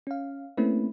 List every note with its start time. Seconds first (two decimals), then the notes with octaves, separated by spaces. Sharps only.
0.07 C#4 F5
0.57 A3 A#3 C4 C#4 E4 B4